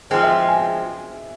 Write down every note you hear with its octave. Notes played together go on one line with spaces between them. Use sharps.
F3 G#3 C4 D#5
E5
G#5